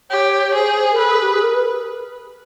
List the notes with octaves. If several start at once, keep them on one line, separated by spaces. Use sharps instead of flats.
G4 C#5
C#5
C#5
G#4 C5
A#4
A4 B4
G#4
G4
G#4
A#4
B4